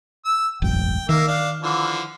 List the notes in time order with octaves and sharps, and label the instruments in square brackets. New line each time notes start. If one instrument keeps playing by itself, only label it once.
[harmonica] E6
[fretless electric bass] E1 A1 F#2 [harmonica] G5
[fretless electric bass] D#3 [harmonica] A#3 E5
[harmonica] D4 F5
D3 E3 F3